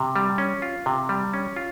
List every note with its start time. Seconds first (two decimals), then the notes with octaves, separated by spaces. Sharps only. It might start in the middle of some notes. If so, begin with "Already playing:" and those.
Already playing: C3
0.16 G3
0.38 C#4
0.62 F4
0.86 C3
1.09 G3
1.33 C#4
1.56 F4